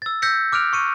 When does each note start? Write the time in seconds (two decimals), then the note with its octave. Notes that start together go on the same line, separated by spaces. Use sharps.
0.02 E6 A6
0.22 E6 G6 A#6 B6 C#7
0.52 D6 F6 F#6 D7 F7
0.73 C#6 C#7 D#7